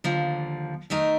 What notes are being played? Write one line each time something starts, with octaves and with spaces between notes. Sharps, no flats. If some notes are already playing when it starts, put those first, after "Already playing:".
D#2 D3 F3
D#3 A3 D#4 A#4